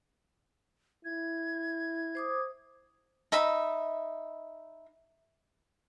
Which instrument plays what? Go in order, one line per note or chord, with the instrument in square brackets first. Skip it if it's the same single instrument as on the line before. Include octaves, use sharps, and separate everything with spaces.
[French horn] E4 [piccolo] G#6
[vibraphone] C5 D6 D#6
[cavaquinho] D#4 E5 B5